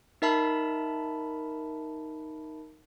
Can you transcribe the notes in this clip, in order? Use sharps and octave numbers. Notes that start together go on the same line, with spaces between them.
D#4 A#4 E5 A5 B5